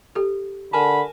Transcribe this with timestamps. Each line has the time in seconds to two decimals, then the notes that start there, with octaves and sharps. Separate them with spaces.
0.15 G4 A4
0.73 D3 A#4 G#5 A5 B5